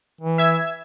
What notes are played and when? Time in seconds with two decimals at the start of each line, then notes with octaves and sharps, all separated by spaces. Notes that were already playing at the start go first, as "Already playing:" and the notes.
0.21 E3
0.38 E5 E6 G#6